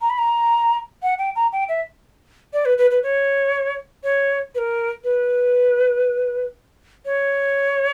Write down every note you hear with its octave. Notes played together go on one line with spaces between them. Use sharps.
A#5
B5
A#5
F#5
G5
A#5
G5
E5
D5
B4
B4
B4
C#5
C#5
B4
A#4
B4
C#5